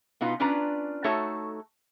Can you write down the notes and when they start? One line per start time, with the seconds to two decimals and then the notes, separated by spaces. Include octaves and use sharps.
0.21 B2 B3 D#4 F4
0.40 C#4 D4 F4 B4 D5 A#5
1.04 A3 D#4 F#4 A4 C#5 A5